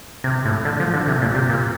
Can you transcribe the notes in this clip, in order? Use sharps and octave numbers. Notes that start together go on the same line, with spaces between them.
C3
A2
D3
F3
D3
C3
A#2
C3
A#2